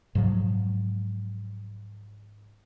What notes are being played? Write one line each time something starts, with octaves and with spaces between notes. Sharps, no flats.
G#2 C3 F3 F#3